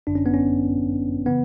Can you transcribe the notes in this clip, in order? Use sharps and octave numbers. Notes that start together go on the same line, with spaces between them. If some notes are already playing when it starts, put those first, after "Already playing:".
G1 F#2 D3 D4
C#4
B3
C#4
C#3 E3 B3